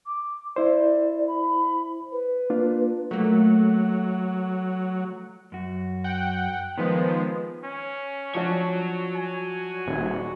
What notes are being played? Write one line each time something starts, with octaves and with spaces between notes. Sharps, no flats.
D6
E4 C5 D5
B5
B4
A#3 D4 F4
F#3 A3 A#3
F#2 F#4
F#5 G5
D#3 F3 G#3 B3 B4
C#4
F3 D4 F#4 C#5
G#5
D#1